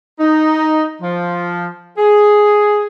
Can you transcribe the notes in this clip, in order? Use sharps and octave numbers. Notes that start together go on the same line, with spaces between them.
D#4
F3
G#4